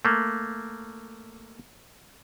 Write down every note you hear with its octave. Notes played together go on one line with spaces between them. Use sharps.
A3 A#3